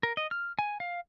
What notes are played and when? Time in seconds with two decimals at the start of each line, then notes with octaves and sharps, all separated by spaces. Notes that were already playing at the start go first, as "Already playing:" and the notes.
0.03 A#4
0.17 D#5
0.31 F6
0.59 G#5
0.80 F5